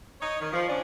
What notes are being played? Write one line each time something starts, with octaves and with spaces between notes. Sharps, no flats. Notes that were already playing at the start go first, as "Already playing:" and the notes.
D#4 C#5
D#3
F3
C#4 D4